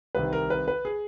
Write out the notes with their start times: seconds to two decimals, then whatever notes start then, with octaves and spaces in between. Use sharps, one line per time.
0.15 C2 C3 D#3 B4
0.33 A#4
0.50 B4
0.68 B4
0.85 G#4